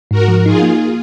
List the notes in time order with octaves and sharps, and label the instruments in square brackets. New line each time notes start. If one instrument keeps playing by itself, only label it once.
[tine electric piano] G#2 [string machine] F#4 A#4
[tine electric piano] F3
[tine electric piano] D#4 [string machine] F4 G#4
[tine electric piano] A#3